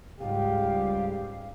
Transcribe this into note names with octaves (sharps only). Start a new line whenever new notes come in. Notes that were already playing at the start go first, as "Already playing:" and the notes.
C#2 G#2 G3 G4 F5